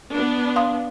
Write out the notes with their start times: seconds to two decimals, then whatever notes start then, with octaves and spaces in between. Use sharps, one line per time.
0.12 B3 D4
0.56 F5 C6 D#6